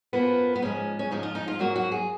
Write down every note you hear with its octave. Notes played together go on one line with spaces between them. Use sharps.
F#2 F3 A#3 B3
B3
G#2 F3 G#3 C#4
C#4
G#2 F3 G#3 D#4
F4
D#4
F4
G#2 F#3 A#3 F#4
F#4
G#4